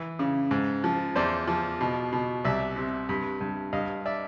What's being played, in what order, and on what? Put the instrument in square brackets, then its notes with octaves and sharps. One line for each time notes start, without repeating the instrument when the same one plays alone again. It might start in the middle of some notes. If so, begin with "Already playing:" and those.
Already playing: [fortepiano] E3
C#3
G#2
F3
E2 C5 D5
F3
B2
B2
C2 D5 E5
C3
G2
G2
G2 D#5 F5
D5 E5